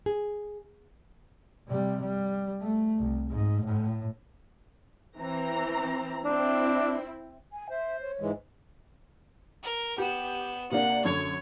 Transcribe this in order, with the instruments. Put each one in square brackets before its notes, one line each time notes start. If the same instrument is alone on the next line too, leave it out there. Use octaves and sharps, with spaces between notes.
[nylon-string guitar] G#4
[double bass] C3 G3
G3
A3
C2
G#2
A2
[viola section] E3 C4 A#5
[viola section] C4 E4 [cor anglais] D4
[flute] G#5
[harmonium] C5 [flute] E5
[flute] C#5
[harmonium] G#2 E3 G#3
[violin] A#4
[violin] B3 E7 [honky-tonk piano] G4
[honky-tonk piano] C3 A#3 D4 [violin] F#5
[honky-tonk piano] F#2 D3 G#6 [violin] C#5